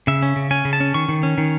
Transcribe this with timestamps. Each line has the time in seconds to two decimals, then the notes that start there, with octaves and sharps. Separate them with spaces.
0.07 C#3 E5
0.23 C#4
0.36 C#3
0.51 C#4 G#5
0.65 C#3
0.73 A5
0.80 C#4
0.94 D#3 C#6
1.09 D#3
1.23 C#4
1.38 D#3